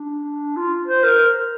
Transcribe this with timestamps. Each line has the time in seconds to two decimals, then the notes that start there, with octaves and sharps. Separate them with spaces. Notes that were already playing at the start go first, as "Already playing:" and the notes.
Already playing: D4
0.56 F4
0.87 C5
1.04 A#4